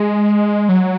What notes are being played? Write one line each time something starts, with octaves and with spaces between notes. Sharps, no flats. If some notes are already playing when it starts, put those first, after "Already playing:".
Already playing: G#3
F#3